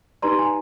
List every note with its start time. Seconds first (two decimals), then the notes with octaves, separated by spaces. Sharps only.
0.22 D#4 G4 B4 D5 A#5 C6
0.39 G#5 A#5